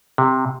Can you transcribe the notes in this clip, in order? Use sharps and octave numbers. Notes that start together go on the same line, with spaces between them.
C3